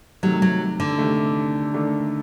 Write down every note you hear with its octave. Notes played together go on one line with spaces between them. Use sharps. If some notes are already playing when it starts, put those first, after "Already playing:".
C3 D#3 F#3 A3
F#3
D3
C3 D#3 A3
D#3 A3 D4 A4